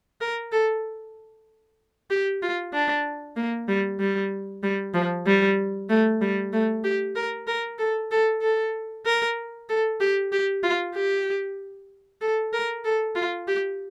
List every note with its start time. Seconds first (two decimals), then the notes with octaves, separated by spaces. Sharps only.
0.21 A#4
0.52 A4
2.10 G4
2.42 F4
2.73 D4
3.37 A#3
3.68 G3
4.00 G3
4.63 G3
4.94 F3
5.26 G3
5.90 A3
6.22 G3
6.53 A3
6.84 G4
7.16 A#4
7.47 A#4
7.79 A4
8.11 A4
8.42 A4
9.05 A#4
9.69 A4
10.00 G4
10.32 G4
10.63 F4
10.95 G4
12.21 A4
12.53 A#4
12.85 A4
13.16 F4
13.48 G4